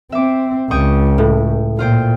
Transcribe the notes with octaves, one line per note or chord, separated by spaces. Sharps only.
C4 E5 D6
C#2 G5 C#6 D#6
A2
A#2 F4 C5 G5